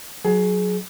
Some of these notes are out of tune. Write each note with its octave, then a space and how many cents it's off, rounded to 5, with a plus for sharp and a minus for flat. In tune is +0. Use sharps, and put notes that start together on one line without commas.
F#3 -10 G#4 +25